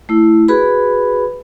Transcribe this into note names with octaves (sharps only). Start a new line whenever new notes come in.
A3 E4
F#4 G#4 B4 B5